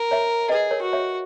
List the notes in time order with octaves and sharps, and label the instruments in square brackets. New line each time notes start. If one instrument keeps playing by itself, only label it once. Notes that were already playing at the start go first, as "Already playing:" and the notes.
Already playing: [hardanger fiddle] A#4
[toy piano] C#5 E5
[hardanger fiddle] G#4 [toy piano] B4 D#5
[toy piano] A#4 C#5
[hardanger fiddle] F#4
[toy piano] C#5 E5